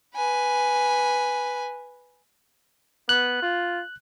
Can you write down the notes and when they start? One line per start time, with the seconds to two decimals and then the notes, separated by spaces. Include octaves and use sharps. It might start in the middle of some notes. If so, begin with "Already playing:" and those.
0.15 B4 G#5
3.09 B3 F#6
3.42 F4